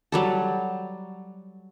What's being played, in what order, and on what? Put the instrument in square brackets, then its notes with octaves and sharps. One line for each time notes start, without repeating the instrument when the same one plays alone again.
[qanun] F#3 G3 A4